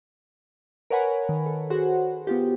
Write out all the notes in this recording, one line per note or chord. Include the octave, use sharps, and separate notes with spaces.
A#4 B4 C#5 F#5 G#5 B5
D#3
A4
F#4 G#4 C5 F#5
B3 F4 G4